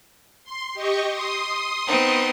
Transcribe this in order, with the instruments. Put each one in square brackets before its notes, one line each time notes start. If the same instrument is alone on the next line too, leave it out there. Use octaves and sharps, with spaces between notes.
[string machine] C6
G4 D#5 C#6
C6 D#6
[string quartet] B3 C4 D#4